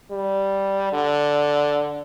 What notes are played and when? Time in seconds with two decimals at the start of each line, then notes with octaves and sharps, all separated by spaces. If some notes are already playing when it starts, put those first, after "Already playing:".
0.11 G3
0.93 D3